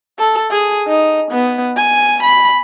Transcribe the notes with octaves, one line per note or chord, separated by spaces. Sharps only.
A4
G#4
D#4
B3
G#5
B5